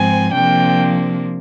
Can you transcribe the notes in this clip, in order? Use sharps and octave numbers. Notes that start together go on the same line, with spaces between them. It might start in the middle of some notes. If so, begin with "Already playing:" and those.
Already playing: G#2 F3 C4 G#5
C3 F3 A#3 D4 G5